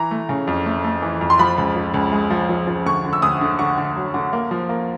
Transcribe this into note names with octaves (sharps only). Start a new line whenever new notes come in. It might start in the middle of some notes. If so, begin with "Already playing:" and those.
Already playing: E3 A#5
A3
C#3
F2
A3
A3
E3
F2
C6
F3 B5
C#2
F3
C#2
G#3
F3
F3
F3
D2 C#6
D3
E6
D2 D#6
D3
D3 C#6
D3
F#3
D3
A#3
F3
A#3